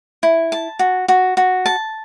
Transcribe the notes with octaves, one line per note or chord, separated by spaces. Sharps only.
E4
A5
F#4
F#4
F#4
A5